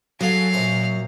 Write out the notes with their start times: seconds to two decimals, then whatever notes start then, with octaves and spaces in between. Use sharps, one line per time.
0.21 F#3 F#4 G#4 A4 F5
0.53 F#2 A#2 C5 C#6